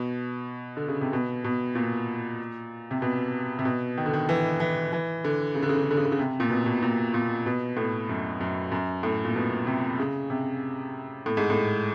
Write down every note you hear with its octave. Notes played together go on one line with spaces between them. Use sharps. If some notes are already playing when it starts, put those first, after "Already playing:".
Already playing: B2
D3
C#3
C3
B2
B2
A#2
C3
B2
C3
B2
D#3
D3
D#3
E3
E3
E3
D3
C#3
D3
C#3
D3
C#3
D3
C#3
D3
C#3
C3
A#2
B2
B2
A#2
A#2
B2
A2
F#2
F#2
F#2
A2
A#2
B2
C3
C#3
C3
A2
G#2
A2